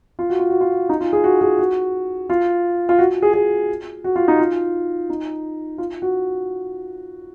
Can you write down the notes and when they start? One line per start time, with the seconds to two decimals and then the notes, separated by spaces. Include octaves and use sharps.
0.19 F4
0.30 F#4
0.39 F4
0.50 F#4
0.61 F4
0.89 D#4
1.01 F4
1.13 G#4
1.24 F#4
1.41 G#4
1.58 F#4
2.30 F4
2.89 F4
2.99 F#4
3.22 G#4
3.33 G#4
4.04 F#4
4.16 F4
4.28 D#4
4.39 F4
5.09 D#4
5.78 F4
6.02 F#4